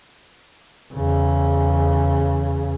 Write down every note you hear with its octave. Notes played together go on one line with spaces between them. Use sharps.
E2 C#3